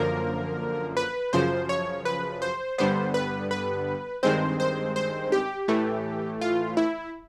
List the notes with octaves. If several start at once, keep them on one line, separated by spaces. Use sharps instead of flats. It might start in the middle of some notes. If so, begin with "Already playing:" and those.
Already playing: F#2 D3 F3 A#3 A#4
B4
F#2 C#3 F3 C5
C#5
B4
C5
G2 D3 G3 B3 C5
B4
B4
G2 D#3 G#3 C4 C5
C5
C5
G4
A2 E3 A3
F4
E4